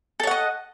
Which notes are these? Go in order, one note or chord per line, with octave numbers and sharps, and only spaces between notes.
A4 C#5 D#5 F#5